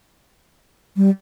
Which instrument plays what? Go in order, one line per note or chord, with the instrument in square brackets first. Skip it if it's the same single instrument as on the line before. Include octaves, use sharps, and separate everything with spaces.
[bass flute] G3